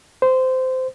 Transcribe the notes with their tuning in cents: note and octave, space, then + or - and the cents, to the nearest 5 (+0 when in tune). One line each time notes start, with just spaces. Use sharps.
C5 -15